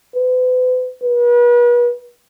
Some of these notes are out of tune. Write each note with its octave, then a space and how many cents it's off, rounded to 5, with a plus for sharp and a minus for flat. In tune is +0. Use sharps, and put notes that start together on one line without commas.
B4 +40
B4 -40